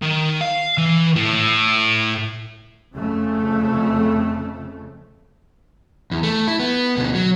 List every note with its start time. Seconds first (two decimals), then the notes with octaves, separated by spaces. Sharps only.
0.02 D#3
0.41 F5
0.78 E3
1.16 A2
2.94 F2 C#3 A3
6.11 E2
6.23 A3
6.48 E4
6.60 B3
6.97 D2 B2
7.15 F#3